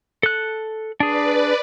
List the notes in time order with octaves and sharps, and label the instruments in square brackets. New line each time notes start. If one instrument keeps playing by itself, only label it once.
[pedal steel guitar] A4 F#6
[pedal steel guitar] D4 G#4 [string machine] B4 D5